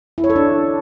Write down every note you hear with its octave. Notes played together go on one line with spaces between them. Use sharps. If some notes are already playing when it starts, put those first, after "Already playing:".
E4
C#5
A4
D4